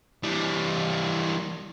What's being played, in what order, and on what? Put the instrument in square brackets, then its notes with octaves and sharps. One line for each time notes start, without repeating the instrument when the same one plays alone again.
[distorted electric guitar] E3 G3